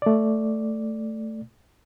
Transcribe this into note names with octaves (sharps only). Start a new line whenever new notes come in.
A3 D5